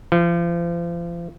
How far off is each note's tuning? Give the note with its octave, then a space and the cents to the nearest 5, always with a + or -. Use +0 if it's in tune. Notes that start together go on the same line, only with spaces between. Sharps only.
F3 -35